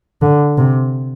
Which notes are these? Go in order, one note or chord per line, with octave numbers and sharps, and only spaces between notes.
D3
C3